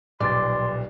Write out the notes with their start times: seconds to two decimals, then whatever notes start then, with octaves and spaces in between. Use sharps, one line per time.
0.20 D#1 B1 D5 C6 D6 A6